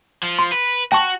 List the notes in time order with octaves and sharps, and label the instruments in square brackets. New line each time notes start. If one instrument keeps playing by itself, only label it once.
[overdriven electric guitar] F3
[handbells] C6
[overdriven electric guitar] B4
[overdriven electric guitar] F#4 [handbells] G5 A5 C#6